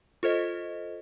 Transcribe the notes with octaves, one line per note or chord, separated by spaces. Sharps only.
F4 A4 C5 D#5